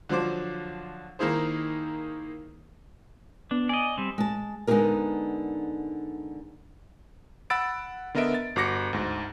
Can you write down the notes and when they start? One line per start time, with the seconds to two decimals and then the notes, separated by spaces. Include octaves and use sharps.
0.09 D3 F3 F#3 C5 D6
1.19 D#3 A#3 D#4 E4 G#4 C5
3.51 B3 D4
3.69 D5 D#5 G#5
3.98 G3 C4
4.18 G#3 A5
4.67 D3 G#3 B3 D#4 G#4 A#4
7.50 F#5 B5 E6 A6 D7
8.14 D3 B3 A#4 D#5 E5 D7
8.34 A6
8.56 G1 F#4 D6 A#6 C#7
8.93 D2 G#2